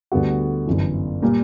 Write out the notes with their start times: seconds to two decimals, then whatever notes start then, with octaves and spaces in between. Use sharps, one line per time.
0.12 D2 D3 G3 B3 F#4
0.67 G1 F#2 E3
1.22 A#2 G3 A#3